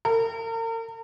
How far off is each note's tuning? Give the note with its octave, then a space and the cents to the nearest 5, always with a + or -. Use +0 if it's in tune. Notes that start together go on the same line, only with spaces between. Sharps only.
A#4 -40